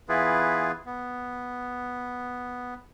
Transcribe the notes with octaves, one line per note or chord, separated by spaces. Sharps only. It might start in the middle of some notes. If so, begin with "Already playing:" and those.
E3 B3 E4 F4 G#4 B4
B3